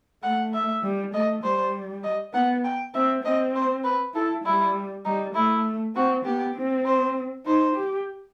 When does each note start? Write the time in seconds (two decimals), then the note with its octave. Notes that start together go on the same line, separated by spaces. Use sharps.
0.23 A3 F#5
0.54 E5
0.83 G3
1.14 A3 D#5
1.44 G3 C5
2.03 D#5
2.34 B3 F#5
2.64 G5
2.94 C4 E5
3.24 C4 D#5
3.55 C5
3.84 B4
4.14 E4 A4
4.45 G3 E4
5.05 G3 D#4
5.35 A3 E4
5.96 C4 F#4
6.25 B3 G4
6.55 C4
6.85 C5
7.46 D#4 C5
7.76 G4